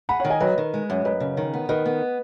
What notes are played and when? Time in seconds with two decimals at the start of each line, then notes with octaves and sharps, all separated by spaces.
0.09 G#4 F#5 B5
0.20 D#3 C#5 F#5
0.30 D#5 G#5
0.41 F#3 B4 D#5
0.58 D#3
0.74 G#3
0.90 F#2
1.05 F#2 B4 D#5
1.20 C#3
1.37 D#3
1.54 B3
1.69 D#3 B4 D#5
1.86 B3